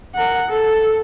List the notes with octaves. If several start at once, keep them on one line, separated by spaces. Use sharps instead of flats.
A#4 F#5
A4